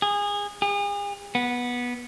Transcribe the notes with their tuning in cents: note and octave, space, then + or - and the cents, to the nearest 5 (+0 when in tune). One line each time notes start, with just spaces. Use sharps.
G#4 -25
G#4 -40
B3 -15